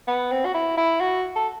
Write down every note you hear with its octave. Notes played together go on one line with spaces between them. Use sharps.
B3
C4
F#4
E4
E4
F#4
A4